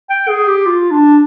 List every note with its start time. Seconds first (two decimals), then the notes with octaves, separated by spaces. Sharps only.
0.10 G5
0.29 G#4
0.48 G4
0.66 F4
0.91 D4